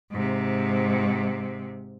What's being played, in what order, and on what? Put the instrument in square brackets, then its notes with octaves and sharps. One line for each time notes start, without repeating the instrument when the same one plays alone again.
[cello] G#2 C3